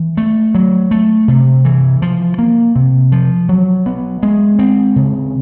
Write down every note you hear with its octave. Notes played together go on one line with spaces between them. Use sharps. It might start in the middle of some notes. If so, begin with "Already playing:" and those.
Already playing: E3
A3
F#3
A3
C3
E3
F3
A#3
C3
F3
F#3
B3
G#3
C4
C#3